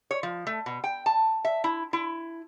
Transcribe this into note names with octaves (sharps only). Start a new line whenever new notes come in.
C#5
F3
A3
B2
G5
A5
E5
E4
E4